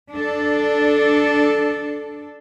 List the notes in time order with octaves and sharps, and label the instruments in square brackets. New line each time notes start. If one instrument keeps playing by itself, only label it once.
[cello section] D4 A4